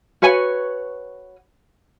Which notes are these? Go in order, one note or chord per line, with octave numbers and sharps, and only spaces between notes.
F#4 B4 C#5 G#5